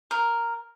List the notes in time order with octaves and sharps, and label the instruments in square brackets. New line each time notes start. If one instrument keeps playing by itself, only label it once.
[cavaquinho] A#4